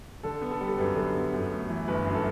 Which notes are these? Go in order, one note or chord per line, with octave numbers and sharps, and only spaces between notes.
D3 A4
B3
A4
G3
A4
F#2 B4
D3
B3
F#2
A3
E3
G1 B4
F#2
A4